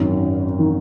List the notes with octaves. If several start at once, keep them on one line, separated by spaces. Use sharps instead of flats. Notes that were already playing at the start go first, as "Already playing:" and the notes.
Already playing: G#1 F#2 D#3
D#3